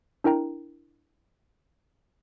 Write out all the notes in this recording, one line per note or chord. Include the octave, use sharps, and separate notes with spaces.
D4 E4 A#4 G5 A#5